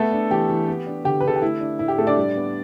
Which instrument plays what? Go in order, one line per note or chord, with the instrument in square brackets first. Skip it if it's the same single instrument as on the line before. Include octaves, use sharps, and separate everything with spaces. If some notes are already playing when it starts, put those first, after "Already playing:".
Already playing: [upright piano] A3 B3 A4
D4
E3 G4
E3
B3
D4
D3 G4
B4
D3 A4
G4
A3 E4
D4
A2 E4
G4
A2 A3 A4
D4 D5
G3
B3